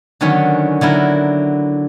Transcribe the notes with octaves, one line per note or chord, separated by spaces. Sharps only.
D3 D#3 F#3 B3 C#4
D3 F#3 E4 A#4